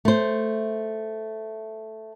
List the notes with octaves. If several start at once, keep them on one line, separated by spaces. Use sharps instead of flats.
A3 C5